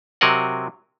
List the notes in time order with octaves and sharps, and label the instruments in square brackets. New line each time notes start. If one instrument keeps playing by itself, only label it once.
[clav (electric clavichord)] C3 F#3 C4 A#4 D#5 F#5